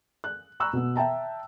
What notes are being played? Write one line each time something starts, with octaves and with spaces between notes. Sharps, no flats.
F#6
A#5 B5 C#6 E6 F#6
B2 B3
E5 G5 A5 A#5